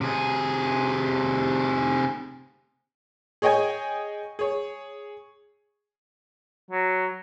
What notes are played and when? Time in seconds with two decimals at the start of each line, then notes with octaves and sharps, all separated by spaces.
0.01 C3 G#4
3.42 G#4 C#5 D#5 G5 G#5 G#6
4.39 G#4 C#5
6.71 F#3